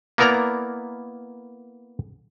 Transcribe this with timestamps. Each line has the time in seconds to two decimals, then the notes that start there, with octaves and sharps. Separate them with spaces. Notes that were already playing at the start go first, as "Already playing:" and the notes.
0.18 A#3 B3 E4 A#4 D5 A#5